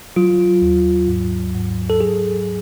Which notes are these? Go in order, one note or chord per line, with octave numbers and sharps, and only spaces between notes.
F#3 F4
D#2
G#2
G#2
A4
F#3 G#4